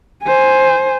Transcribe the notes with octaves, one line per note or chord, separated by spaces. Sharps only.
C5 G#5